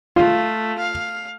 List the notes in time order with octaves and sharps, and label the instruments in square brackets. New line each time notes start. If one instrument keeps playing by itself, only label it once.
[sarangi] A3 [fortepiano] F4
[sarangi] F5